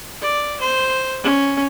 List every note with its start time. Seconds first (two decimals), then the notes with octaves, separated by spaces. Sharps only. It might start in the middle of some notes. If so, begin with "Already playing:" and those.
0.22 D5
0.61 C5
1.24 C#4